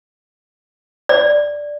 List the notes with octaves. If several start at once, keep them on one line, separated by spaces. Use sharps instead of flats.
D5